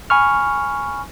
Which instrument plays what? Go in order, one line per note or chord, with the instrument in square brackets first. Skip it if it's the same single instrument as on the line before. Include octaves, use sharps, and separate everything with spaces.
[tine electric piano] G#5 B5 C#6 F6